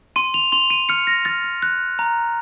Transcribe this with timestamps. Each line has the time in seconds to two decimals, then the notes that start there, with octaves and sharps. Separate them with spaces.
0.16 C6 D#7
0.34 F7
0.52 C6 F7
0.70 D#7
0.89 F6 C#7
1.07 A#6
1.25 F6 A6
1.44 A6
1.63 F#6
1.99 A#5